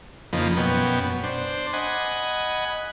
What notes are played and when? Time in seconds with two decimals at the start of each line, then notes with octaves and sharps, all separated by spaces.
0.33 F2 C#3 F3 A#3 D#4 B5
0.57 F#2 B2 B3 C#4 G5
1.24 D4 C5
1.73 D#5 F#5 G#5 B5